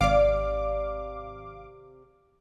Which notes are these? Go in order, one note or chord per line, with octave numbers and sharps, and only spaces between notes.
G#1 C3 D5 F5 D6